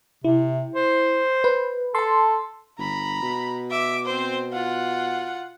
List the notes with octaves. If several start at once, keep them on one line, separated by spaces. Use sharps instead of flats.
C3 E4
C5
B4
A4 A5 C6
G1 A#5 B5
B2
E5 D6
C4 C5
F4 F#5